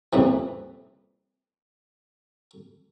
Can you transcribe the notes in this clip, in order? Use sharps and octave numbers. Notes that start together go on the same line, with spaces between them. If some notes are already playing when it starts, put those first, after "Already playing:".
C2 F2 A#2 E3